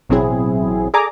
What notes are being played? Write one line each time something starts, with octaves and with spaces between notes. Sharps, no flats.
A1 B2 F#3 C4 E4 G#4
G#4 A4 D5 G#5 A#5 D6